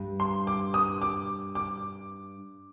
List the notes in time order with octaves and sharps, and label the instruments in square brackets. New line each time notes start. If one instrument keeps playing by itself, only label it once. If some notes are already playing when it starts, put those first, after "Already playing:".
Already playing: [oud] G2
[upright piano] C6
D6
D#6
D6
D6